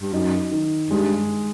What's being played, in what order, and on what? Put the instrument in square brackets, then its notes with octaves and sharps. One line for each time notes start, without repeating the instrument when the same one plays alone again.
[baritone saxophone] G2
[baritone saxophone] F#2 [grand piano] D#4
[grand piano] D#3
[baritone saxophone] G2 [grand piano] G#3